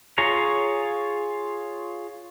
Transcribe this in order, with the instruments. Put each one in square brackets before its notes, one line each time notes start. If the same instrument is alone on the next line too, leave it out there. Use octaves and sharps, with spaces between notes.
[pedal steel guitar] F4 G#4 C#5 A#5